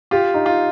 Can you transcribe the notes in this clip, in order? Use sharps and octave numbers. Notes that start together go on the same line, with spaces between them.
F4 G4
D#4
F4